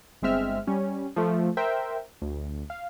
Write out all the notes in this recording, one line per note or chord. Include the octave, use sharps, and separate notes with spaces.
G1 G#3 C4 E5 F6
G3 C#4
F3 A3
A#4 C5 E5 G5
D2
F5